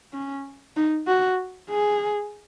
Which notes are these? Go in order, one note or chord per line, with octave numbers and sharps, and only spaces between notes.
C#4
D#4
F#4
G#4